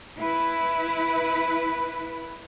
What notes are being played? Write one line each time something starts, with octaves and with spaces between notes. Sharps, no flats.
E4 B4